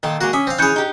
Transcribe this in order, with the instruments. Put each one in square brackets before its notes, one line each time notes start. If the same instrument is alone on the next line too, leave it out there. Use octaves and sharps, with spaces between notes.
[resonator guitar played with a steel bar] A#2 A4 G5 [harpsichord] D#3
[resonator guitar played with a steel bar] G#3 A#3 [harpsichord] F#4
[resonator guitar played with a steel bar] C#4 [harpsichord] E5 [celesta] G#5 D6 D#6
[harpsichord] C4 F5
[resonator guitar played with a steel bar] E3 C#4 [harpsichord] G#4 C#5 [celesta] F#6 G6 C#7
[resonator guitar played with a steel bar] D#4 G4